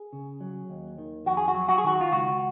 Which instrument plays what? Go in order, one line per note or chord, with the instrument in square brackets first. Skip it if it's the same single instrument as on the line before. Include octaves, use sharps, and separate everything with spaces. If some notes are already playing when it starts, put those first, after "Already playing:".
Already playing: [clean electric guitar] G#4
C#3
F#3
D#2
D#3
F2 F#4
G#4
F#4
F#3
F#4
G#4
D#3 F#4
F4
C#2 F#4